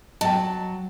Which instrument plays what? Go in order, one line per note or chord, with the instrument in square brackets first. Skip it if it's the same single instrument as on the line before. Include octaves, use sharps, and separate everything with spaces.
[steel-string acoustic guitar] F#3 [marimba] D#5 G5 [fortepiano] A5